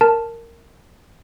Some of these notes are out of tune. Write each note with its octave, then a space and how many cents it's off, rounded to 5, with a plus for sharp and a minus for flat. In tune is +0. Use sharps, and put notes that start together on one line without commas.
A#4 -10 A5 +0